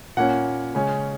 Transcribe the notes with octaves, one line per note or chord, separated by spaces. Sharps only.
A#2 A#3 C#4 F#5
C#3 G#3 C#4